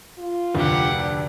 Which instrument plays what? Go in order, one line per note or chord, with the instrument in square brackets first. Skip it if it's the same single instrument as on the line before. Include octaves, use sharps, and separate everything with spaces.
[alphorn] F4
[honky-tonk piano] F1 D2 [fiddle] G4 F#5
[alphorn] D4